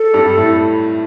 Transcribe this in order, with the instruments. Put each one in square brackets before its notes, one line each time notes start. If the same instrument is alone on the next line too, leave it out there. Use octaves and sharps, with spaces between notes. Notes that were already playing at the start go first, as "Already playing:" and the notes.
Already playing: [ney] A4
[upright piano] G2 G3
A2 A3